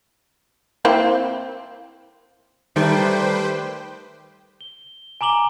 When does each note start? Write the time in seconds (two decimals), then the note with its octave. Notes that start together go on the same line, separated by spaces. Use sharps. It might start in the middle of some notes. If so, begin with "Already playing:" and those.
0.85 A#3 C4 E4
2.76 D#3 G3 A3 B4 C5 G5
4.61 G7
5.21 G#5 A#5 D6 F#7 G7